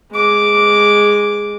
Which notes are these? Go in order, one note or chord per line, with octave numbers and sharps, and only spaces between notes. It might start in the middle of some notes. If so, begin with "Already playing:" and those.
G#3 D6